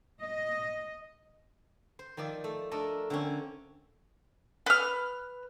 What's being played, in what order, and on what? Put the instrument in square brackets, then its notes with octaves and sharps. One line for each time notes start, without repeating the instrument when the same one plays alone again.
[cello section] D#5
[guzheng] C5
D#3 F3 D#4 D5 E5
A3
A3 D4 A4 A#4 D#5
D3 C4 C#4
[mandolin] B4 F6